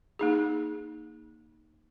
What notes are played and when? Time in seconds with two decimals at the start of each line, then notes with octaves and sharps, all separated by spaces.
0.19 A#3 D#4 G#4